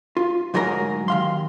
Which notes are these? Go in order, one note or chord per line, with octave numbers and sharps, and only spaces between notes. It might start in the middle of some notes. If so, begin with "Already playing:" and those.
F4
D2 G#2 F#3 G#4 A#4 A#5
D#2 F5 C6